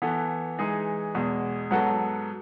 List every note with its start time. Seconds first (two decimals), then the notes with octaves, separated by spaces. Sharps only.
0.02 E3 B3 F#4 A4
0.59 E3 G#3 D#4 G#4
1.15 E2 B2 G#3
1.71 G#2 F#3 B3 F#4 A4